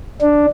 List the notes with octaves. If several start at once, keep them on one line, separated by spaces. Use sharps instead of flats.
D4